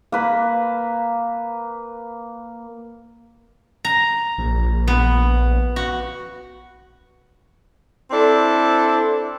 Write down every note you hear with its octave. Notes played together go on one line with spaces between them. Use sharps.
A#3 B4 B5
A#5
A#1
B3
F#4
C4 D4 E4 A4